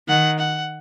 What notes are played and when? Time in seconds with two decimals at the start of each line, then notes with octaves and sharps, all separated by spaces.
0.08 D#3 F#5
0.39 F#5